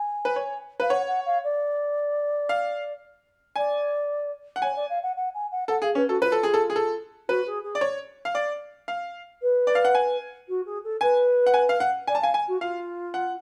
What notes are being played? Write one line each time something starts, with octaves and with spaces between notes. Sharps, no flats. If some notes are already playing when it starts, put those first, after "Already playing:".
Already playing: G#5
B4
C#5
B4 F5
C#5 F#5
F#5
F5
D5
F5
D5 G#5
F#5
C#5 G#5
D5
F5
F#5
F#5
G#5
F#5
A4 F#5
G#4 F5
C#4 B4
F#4 A4
F4 B4
A4
G#4
A4
G#4
A4
F#4 B4
G#4
G#4
D5
C#5
F5
D5
F5
B4
D5
F5
F#5
G#5
F#4
G#4
A4
B4 G#5
F#5
G#5
F5
F#5
D5 G#5
A5
F5 G#5
G#5
F#4
F4 F5
F#5